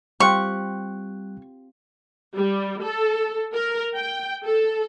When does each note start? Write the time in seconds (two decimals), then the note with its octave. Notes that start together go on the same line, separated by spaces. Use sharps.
0.20 G3 C4 F4 G4 C#6 F#6
2.36 G3
2.82 A4
3.54 A#4
3.96 G5
4.44 A4